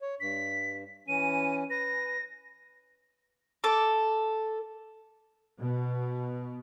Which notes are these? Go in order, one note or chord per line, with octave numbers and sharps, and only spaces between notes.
C#5
G2 B6
E3 C#4 D#7
B4 A#6
A4 D6
B2